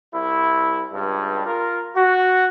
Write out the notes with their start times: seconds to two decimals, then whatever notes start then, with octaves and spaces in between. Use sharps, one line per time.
0.13 C2 E4
0.93 C#2 G2
1.46 F4 A#4
1.95 F#4